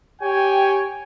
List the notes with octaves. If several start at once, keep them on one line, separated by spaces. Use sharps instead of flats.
G4 C#5 G5 G#5